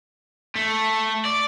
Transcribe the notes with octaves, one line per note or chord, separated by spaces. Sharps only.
A3
D5